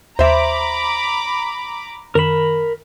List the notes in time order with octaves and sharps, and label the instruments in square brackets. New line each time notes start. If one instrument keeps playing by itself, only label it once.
[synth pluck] D#2 [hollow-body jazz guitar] C5 E5 [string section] A#5 B5 D6
[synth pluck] F#2 D#3 E7 [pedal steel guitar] A#4 B5